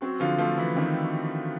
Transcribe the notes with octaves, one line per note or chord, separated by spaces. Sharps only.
F#3 C4 F#4
D3 F3 F4
F3 A3 F4
E3 F3 E4
D#3 C4 D#4